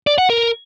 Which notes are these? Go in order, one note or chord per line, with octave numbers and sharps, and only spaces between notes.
D5
F#5
A#4